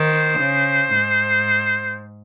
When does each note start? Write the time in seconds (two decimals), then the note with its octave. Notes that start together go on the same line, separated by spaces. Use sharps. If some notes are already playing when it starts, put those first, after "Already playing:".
Already playing: D#3 C5
0.40 C#3
0.94 G#2